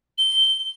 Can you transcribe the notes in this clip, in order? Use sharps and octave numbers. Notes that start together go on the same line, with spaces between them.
G7